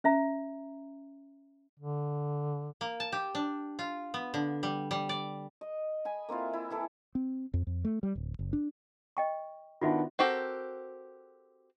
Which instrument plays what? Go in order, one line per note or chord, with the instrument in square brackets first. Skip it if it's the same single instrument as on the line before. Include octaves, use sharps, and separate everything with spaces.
[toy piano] C#4 E5 A#5
[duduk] D3
[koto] A#3
A5
G4
D4
F4
B3
D3
G3
G3
D5
[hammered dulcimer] D#5
G#5 B5
A#3 C4 E4 F4
E4
E3 E4 A4
[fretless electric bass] C4
F2
F2
A3
G3
D1
F#1
D4
[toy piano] D#5 G5 C#6
[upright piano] D#3 B3 D4 [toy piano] F4 F#4 E5
[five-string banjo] C4 F#4 G4 A4 A#4